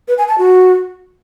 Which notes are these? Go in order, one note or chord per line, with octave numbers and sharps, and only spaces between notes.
B4
G#5
A5
F#4